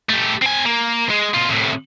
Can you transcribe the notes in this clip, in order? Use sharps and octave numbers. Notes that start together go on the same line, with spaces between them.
A3 G4
C4 G#5
A#3
G#3
B2 F4
C2 A2